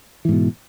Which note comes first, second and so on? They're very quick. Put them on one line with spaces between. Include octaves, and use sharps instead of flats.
E3 G#2 B2